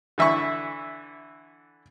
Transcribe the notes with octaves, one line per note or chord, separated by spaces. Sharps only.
D3 E3 E5 B5 C#6